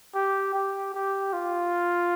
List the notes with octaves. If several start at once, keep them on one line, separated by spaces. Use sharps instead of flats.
G4
G4
G4
F4